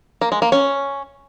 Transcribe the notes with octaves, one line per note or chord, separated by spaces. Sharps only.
A#3
G#3
A#3
C#4